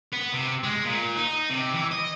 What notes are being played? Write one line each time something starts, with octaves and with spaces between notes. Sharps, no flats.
B3
C3
G#3
A#2
D#4
C3
E3
D#5